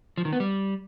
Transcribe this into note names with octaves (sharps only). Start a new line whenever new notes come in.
F3
D#3
B3
G3